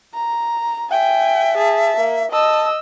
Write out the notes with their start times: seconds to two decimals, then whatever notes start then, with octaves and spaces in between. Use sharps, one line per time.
0.14 A#5
0.91 E5 G5 G#5
1.57 G#4 A5
1.97 A#3
2.32 D#5 A5 E6